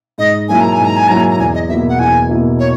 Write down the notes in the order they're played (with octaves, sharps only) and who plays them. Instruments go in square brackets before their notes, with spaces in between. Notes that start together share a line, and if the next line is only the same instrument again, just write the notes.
[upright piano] G#2 [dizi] D#5
[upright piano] F#3 A#3 E4 [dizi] G#5
[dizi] A#5
G#5
[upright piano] G#2
[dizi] A#5
G#5
[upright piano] F#3 A#3 E4 [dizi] A#5
[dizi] G#5
A#5
[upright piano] E2 [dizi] G#5
[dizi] D#5
[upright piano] B2 A#3 E4 [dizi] E5
[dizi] F#5
[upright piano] E2 [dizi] G#5
[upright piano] B2 A#3 E4
[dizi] C#5